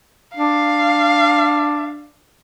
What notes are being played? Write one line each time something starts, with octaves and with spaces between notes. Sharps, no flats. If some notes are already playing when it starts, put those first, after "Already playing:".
D4 F5